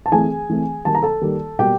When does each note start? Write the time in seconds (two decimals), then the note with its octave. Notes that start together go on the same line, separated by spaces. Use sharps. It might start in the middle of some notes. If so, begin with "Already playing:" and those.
0.06 A5
0.12 E3 A3 C4 G#4 G#5
0.49 E3 A3 C4
0.85 D#3 G3 A#3 A5
0.95 A#5
1.02 A4 A5
1.21 D#3 G3 A#3
1.59 B2 G3 A#3 G4 G5